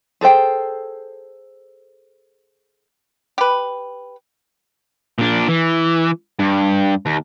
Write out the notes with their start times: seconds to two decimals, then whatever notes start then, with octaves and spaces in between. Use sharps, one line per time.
0.21 G#4 A4 C5 G5
3.38 G4 B4
5.19 A#2 D4
5.48 E3
6.39 G2
7.06 D#2